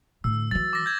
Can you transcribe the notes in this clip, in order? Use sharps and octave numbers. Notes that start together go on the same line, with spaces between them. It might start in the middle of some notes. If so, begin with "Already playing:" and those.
A2 D3 E6
E3 F#3 A6
D6 A#6
G6 G#6